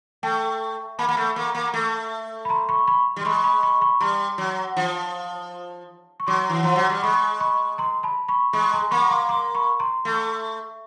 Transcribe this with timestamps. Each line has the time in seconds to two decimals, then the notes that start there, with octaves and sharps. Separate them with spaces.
0.23 A3 G5 A5
0.99 A#3 A5 B5
1.09 A#3
1.17 A3
1.36 A#3
1.55 A#3
1.74 A3
2.45 B5
2.49 A#5 C6
2.69 B5 C#6
2.88 B5 C#6
3.16 G3
3.21 C6
3.25 G#3 B5 C#6
3.44 B5 C#6
3.63 B5 C#6
3.81 B5 C#6
4.01 G3 A#5 C6
4.38 F#3
4.77 F3
6.20 C#6
6.27 F#3 C6 D6
6.49 E3
6.63 F3 A#5 C6
6.76 F#3
6.90 G3
7.02 G#3 B5 C#6
7.40 B5 C#6
7.78 A#5 C6
8.03 A5 B5
8.28 B5 C#6
8.53 G#3 B5 C#6
8.73 A#5 C6
8.91 A#3 B5 C#6
9.11 C6 D6
9.29 C6 D6
9.55 B5 C#6
9.80 A#5 C6
10.05 A3